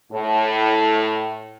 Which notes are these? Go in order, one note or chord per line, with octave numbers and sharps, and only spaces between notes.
A2